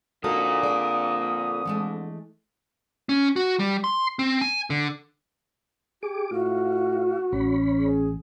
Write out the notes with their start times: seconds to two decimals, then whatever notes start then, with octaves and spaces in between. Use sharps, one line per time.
0.24 F2 D3 D#4 F4 F#4 A4 A#4 D#6
0.63 G#4 D5
1.65 E3 G#3 A3
3.09 C#4
3.36 F#4
3.59 G3
3.84 C6
4.19 C4
4.41 G#5
4.70 D3
6.03 G4 G#4 D6
6.31 A2 F4 F#4
7.32 A1 C#4 C#5 B5
7.77 G#4